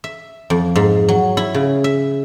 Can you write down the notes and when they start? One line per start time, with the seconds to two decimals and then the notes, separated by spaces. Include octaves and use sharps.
0.04 E5
0.50 F2
0.76 G#2
1.09 F#3
1.37 E4
1.54 C#3
1.84 E5